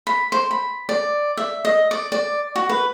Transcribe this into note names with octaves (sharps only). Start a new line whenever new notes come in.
B5
C5
B5
D5
E5
D#5
D5
D5
F#4
B4